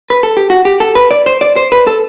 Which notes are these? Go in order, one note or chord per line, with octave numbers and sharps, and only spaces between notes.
B4
A4
G4
F#4
G4
A4
B4
D5
C5
D5
C5
B4
A4